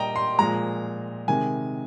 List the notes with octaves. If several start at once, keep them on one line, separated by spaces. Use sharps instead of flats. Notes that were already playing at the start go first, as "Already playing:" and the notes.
Already playing: A#2 G3 D#5 G5 A#5
C6
A#2 F3 G#3 A#5
C3 D#3 G#3 G#5